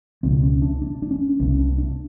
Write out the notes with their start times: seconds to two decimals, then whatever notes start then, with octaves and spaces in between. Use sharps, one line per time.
0.23 C#2 B2 C4
0.43 C#4
0.62 D4
0.82 D4
1.02 D4
1.11 C#4
1.40 C2 C3 C#4
1.59 D4
1.78 D4